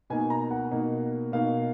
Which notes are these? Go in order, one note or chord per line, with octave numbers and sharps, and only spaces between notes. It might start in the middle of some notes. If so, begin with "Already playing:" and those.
B2 A#3 D#4 G#5
A#5
F#5
B2 A#3 D#4
B2 A#3 D#4 F5